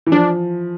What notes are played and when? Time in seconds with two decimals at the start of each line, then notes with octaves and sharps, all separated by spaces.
0.06 E3
0.12 F3 D4